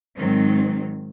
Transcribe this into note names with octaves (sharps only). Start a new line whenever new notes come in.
G#2 D#3 F#3 C4